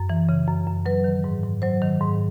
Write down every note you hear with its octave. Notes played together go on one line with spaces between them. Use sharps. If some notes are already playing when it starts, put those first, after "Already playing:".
Already playing: F#2
E3
C#3
F#2
F#2
F#3 B4
D#3
G#2
G#2
F#3 C5
D#3
G#2